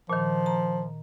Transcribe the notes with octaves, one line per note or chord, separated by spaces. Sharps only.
A#2 D#3 F3
A#5